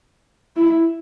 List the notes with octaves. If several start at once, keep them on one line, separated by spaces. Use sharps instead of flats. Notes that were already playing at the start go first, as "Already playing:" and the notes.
E4